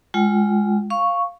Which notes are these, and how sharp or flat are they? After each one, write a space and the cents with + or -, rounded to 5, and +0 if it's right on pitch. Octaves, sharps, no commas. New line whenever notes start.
G#3 +0 F4 -5 G5 -40
F5 +0 C#6 +0